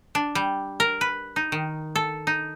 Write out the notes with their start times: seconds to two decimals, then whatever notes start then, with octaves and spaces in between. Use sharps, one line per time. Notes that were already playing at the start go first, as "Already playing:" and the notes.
0.15 D4
0.35 G3
0.80 A#4
1.01 B4
1.36 D#4
1.52 D#3
1.96 A4
2.27 D#4